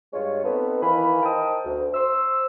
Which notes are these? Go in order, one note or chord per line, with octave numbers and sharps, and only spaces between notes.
G2 G#3 F4 C#5
B3 C4 D#4 A4 B4
D#3 E3 F5 G#5 B5
D#4 A#4 C5 G5 A5 D#6
D2
C5 E6